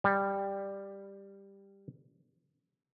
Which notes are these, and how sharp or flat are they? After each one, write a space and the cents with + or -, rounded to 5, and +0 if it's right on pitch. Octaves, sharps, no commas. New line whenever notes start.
G3 +10